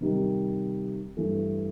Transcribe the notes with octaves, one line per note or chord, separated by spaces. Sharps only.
C3 D#3 G3
G2 E3 A3